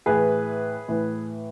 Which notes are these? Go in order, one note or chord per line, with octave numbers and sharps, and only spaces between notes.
A2 E3 G#4 B4
A2 E3